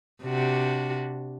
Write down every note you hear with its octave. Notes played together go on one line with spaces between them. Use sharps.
C3 D4 F#4